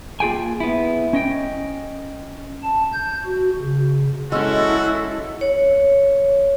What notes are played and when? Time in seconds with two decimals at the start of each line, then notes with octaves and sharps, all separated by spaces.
0.20 A#3 F4 G#4 G5 G#5
0.60 B3 E4
1.13 C#4 D#5 G5
2.63 A5
2.93 G6
3.25 F#4
3.60 C#3
4.32 G#3 C#4 E4 F#4 A4 E6
5.41 C#5